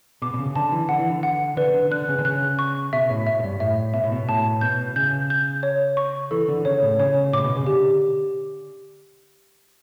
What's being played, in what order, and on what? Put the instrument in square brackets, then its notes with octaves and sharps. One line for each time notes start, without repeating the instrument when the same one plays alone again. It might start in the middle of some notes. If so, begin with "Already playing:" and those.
[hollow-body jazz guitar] B2 [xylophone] D6
[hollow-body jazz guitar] B2
C#3
[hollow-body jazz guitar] D3 [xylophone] A5
[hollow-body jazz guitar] E3
[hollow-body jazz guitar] D3 [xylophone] F#5
[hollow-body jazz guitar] E3
D3
[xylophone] F#5
[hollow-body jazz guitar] D3 [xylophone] B4
[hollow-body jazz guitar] D3
[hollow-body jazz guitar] D3 [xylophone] F#6
[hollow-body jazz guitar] C#3
D3
[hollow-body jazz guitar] C#3 [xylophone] F#6
[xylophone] C#6
[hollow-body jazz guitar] B2 [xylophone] E5
[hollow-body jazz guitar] A2
[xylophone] E5
[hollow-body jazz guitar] A2
G2
[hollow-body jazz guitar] A2 [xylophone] E5
[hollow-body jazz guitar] B2 [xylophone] E5
[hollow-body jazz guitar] A2
B2
[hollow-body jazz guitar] A2 [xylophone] A5
[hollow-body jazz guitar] B2 [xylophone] G6
[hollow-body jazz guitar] C#3 [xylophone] G6
[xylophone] G6
C#5
C#6
[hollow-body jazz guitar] E3 [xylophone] A4
[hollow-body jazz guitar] D3
[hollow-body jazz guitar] C#3 [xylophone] C#5
[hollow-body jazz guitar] A2
[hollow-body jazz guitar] C#3 [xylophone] C#5
[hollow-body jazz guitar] A2 [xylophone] D6
[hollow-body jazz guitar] B2
C#3
[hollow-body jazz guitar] D3 [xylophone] G4